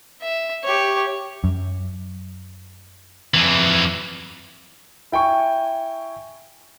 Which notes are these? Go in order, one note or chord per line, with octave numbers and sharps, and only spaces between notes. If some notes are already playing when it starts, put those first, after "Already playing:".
E5
G4 C#5
F#2
F2 E3
E4 G5 G#5 C#6